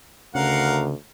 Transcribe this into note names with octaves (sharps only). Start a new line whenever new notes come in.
D2 C#3 A#4 F5 F#5